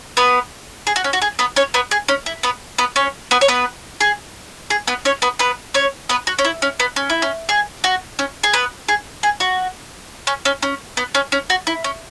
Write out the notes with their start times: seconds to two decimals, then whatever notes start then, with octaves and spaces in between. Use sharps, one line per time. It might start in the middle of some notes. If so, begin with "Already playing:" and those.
0.17 B3 B4
0.87 G#4
0.96 F#4
1.04 C#4
1.13 F#4
1.22 G#4
1.39 B3 B4
1.56 C#4 C#5
1.74 B3 B4
1.91 G#4
2.08 C#4
2.26 E4
2.43 B3 B4
2.78 B3 B4
2.96 C#4 C#5
3.31 B3 B4
3.41 C#5
3.48 B3 B4
4.00 G#4
4.70 G#4
4.87 B3 B4
5.05 C#4 C#5
5.22 B3 B4
5.39 B3 B4
5.74 C#4 C#5
6.09 B3 B4
6.27 F#4
6.39 C#4
6.45 E4
6.62 C#4
6.80 B3
6.96 C#4
7.10 E4
7.22 C#4
7.49 G#4
7.84 F#4
8.19 C#4
8.43 G#4
8.53 B3 B4
8.88 G#4
9.23 G#4
9.40 F#4
10.27 C#4
10.45 C#4
10.63 C#4
10.97 B3
11.15 C#4
11.32 C#4
11.50 F#4
11.67 E4
11.84 C#4